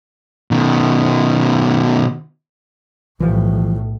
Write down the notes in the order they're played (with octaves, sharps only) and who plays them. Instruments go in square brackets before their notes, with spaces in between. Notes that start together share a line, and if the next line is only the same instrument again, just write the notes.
[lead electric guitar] B2 D#3
[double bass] B1 A2 [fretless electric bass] E3 F3 G3